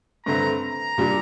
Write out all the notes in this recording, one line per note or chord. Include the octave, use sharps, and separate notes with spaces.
G2 D3 A3 C4 A#5
A#5
A#2 G3 D4